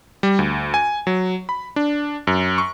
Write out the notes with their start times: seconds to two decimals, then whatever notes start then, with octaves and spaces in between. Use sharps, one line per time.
0.23 G3
0.39 D2
0.74 G#5
1.07 F#3
1.49 B5
1.76 D4
2.27 F#2
2.58 C#6